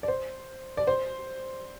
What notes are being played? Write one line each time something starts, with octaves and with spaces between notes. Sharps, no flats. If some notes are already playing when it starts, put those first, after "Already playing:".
D5
C5
D5
C5